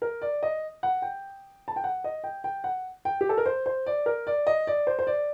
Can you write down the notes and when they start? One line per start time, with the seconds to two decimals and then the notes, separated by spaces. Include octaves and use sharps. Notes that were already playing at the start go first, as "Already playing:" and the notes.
0.02 A#4
0.22 D5
0.43 D#5
0.83 F#5
1.02 G5
1.68 A5
1.76 G5
1.84 F#5
2.04 D#5
2.24 G5
2.44 G5
2.64 F#5
3.05 G5
3.21 G4
3.29 A4
3.37 A#4
3.46 C5
3.66 C5
3.86 D5
4.06 A#4
4.27 D5
4.47 D#5
4.67 D5
4.87 C5
4.99 C5
5.07 D5